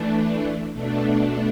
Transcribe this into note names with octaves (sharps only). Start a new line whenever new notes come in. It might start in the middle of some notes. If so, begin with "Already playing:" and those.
Already playing: E3 A3 D4
B2 A3 D4